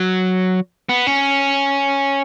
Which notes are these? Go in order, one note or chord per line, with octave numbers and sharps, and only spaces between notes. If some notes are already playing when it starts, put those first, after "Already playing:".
Already playing: F#3
B3
C#4